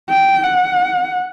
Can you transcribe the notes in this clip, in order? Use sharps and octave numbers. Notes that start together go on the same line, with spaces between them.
G5
F#5